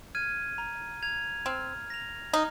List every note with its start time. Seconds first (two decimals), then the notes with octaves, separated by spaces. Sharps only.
0.15 F6 G#6 D#7
0.58 A#5
1.03 G#6 F7
1.46 C4 F6
1.90 A#6 F7
2.33 D#4 F6